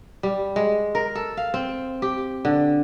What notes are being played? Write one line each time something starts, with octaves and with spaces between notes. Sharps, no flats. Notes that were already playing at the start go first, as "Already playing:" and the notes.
G3
G#3
A#4
A4
F5
C4
G4
D3